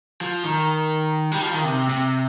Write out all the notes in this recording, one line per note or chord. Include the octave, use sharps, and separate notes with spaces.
F3
D#3
G3
F3
D#3
C3
C3